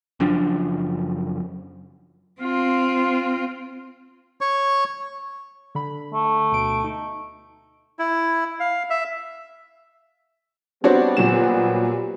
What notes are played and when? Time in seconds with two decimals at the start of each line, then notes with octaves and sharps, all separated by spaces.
0.20 F#1 F#2 F3 D4
2.41 C4 F4
4.41 C#5 C#6
5.75 D3 B5
6.13 A3
6.52 D2 B2 D7
6.84 D#4
7.99 E4
8.60 F5
8.90 E5
10.84 G3 B3 C4 D4 F#4 C#5
11.17 A#2 F#3 E7